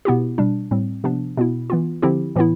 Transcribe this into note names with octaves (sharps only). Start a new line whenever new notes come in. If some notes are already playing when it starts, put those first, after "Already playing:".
B2 B3 E4 G4
B2 G3 D4
A2 G3 C4
C3 F3 B3 D4
B2 B3 E4
E3 B3 F4
D3 F3 C4 E4 G4
A2 E3 B3 E4